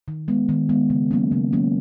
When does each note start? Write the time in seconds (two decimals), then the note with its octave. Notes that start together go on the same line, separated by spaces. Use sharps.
0.08 D#3
0.28 G#3 B3
0.49 D#3
0.69 G#3 B3
0.90 C#3
1.11 F#3 A#3 C#4
1.32 C#3
1.53 F#3 A#3 C#4